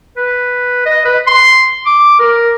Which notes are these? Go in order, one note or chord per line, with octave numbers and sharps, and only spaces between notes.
B4
D#5
B4
C6
D6
A#4